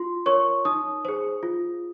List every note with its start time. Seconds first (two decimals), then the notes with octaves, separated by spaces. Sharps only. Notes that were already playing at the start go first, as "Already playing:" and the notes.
Already playing: F4 C6
0.26 A#4 C#5 C#6
0.65 D#4 D#6
1.05 G#4 C5
1.43 F4